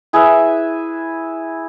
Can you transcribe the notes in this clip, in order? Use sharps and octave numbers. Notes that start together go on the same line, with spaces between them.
E4 G#4 B4 E5